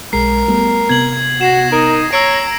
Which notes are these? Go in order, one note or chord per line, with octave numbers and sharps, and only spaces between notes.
B1 G#3 A#4 C7
G3 A3 B3
C3 B3 G#6 F#7
F#4 A#6 C7 E7
D#4 A#4
C#5 A#5 E6 C7 D7